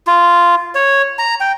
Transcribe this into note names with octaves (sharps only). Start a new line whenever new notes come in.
F4
C#5
A#5
G5